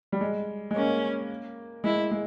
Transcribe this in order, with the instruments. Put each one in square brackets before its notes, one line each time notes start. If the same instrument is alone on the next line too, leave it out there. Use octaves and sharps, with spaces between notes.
[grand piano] G3
G#3
G#3
[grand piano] A#3 [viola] C#4
[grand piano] G#3 [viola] E4
[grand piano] G#3